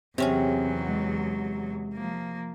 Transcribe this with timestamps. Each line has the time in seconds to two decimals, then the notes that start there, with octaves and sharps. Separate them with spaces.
0.18 E2 C3 F#3 C4 C#4 G#4
0.89 G#3
1.94 F3 A#3